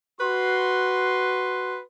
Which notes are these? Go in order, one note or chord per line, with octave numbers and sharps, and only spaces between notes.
F#4 B4 C6